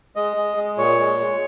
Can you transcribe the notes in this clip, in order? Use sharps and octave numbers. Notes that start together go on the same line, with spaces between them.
G#3 D#5
G#3
G#3
A#2 C#5
G#3
G#3